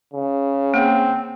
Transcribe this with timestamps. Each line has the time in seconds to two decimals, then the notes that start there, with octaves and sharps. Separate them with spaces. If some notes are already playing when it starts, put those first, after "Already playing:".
0.14 C#3
0.74 A#3 C4